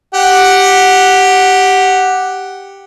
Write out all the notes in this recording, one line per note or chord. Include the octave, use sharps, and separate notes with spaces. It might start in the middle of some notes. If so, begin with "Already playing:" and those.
G4 F#5